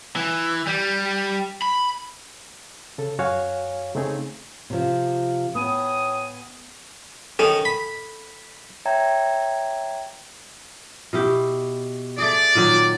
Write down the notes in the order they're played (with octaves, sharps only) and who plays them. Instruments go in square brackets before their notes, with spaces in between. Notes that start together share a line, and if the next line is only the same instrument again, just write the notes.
[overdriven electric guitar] E3
G3
B5
[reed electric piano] C#3 A4
F#2 F#4 C#5 F5 G#5
C#3 A3 C4 D#4 G#4
[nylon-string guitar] C3 F3
[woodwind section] A2 G#5 D#6 [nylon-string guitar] B3
[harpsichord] D#3 C#4 [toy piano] A4
[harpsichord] B5
[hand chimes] C#5 E5 G5 A#5 G#6
[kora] B2 E4 G4
[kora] A3 G#4 [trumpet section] D5
[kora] A#2 D#3 F#3